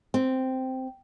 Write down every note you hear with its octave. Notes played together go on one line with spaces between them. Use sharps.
C4